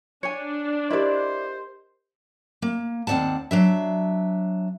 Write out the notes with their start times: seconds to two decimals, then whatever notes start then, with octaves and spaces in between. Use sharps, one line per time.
0.23 D4 C#5 G#5 C#7
0.90 E4 G4 A#4 C5 D5 D#5
2.62 A#3
3.07 D#2 C4 D5 F#5 A5
3.51 F#3 D4 E5